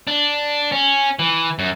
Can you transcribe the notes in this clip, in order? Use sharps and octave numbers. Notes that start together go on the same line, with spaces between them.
D4
C#4
E3
F#2